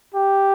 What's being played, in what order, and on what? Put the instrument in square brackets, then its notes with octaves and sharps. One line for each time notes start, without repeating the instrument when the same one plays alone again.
[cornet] G4